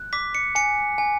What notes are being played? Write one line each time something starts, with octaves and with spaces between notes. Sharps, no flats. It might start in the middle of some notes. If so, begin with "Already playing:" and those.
Already playing: F#6
D6 B6
C#7
G#5 C#7
G#5